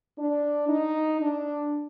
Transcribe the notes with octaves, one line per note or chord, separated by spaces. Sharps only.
D4
D#4
D4